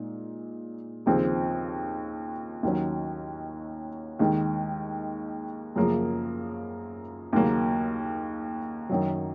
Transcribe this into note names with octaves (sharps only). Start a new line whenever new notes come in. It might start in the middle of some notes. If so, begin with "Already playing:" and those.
Already playing: A#2 G#3 D#4
D#2 C#3 F3 C4
D#2 D#3 F#3 C#4
D#2 D#3 G#3
F#2 C#3 F3 A#3 F4
D#2 C#3 F#3 A#3
F#2 D#3 F#3